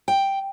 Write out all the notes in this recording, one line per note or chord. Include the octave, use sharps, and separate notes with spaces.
G5